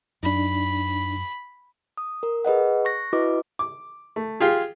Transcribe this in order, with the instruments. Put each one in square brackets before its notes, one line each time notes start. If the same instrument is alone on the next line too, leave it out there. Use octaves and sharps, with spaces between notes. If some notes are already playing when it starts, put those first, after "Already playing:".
[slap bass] F#2 [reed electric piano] D4 D#4 [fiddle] B5
[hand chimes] D#6
A#4
G#4 B4 D#5 F#5
C#6 F#6 A#6
E4 F#4 B4 D#5 D6
[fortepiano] D6
A3
F4 G4 G#4